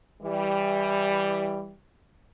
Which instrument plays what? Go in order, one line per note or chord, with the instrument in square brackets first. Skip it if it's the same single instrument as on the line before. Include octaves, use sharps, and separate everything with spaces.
[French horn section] E3 G3